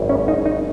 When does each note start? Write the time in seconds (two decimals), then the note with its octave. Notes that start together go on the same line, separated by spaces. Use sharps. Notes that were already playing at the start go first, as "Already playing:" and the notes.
Already playing: G#1 F#2 C#3 G#3 B3
0.09 C#4
0.28 D#4
0.46 D#4